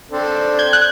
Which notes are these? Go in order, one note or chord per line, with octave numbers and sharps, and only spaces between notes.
C4 D4 A4
G6 G#6
F#6